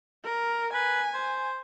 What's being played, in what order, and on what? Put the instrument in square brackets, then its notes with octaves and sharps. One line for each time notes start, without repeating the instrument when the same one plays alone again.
[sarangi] A#4
[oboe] B4 [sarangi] G#5
[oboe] C5